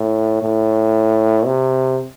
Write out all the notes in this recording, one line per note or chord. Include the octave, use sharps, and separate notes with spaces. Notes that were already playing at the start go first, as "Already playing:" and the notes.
Already playing: A2
A2
C3